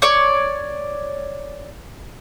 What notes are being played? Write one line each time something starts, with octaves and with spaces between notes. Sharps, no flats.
C#5 D5